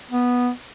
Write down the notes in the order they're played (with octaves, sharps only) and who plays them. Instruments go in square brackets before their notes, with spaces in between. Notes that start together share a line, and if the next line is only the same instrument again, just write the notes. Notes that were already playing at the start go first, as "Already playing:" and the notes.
[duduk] B3